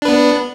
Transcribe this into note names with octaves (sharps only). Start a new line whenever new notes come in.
B3 D4 B4